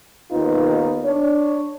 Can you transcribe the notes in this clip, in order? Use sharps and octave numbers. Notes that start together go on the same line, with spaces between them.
D#2 B3 D#4 F4 B4
D4 C#5